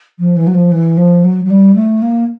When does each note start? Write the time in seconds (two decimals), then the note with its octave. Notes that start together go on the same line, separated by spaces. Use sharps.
0.19 F3
0.36 E3
0.47 F#3
0.54 F3
0.71 E3
0.97 F3
1.24 F#3
1.44 F#3
1.50 G3
1.75 A3
2.02 A#3